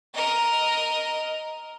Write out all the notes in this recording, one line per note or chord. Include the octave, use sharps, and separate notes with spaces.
A#4 D#5